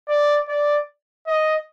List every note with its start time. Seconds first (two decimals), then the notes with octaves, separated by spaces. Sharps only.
0.09 D5
0.48 D5
1.27 D#5